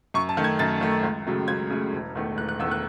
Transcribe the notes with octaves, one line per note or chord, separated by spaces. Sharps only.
F#2 C#6
A5
D#3 A3
G#6
F#2 A6
D#3 A3
C#2
C#3 F#3 A3
C#2 G#6
C#3 F#3 A3
E1
E2 D#3 A3
E1 F#6
F#6
E2 D#3 A3 E6
F#6